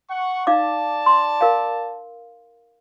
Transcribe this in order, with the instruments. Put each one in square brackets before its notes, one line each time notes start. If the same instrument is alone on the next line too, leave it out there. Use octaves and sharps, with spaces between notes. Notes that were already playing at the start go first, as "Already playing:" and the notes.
[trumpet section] F#5 C#6
[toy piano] D#4 F5 D6 [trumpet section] D5 A5
[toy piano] C6
A#4 F5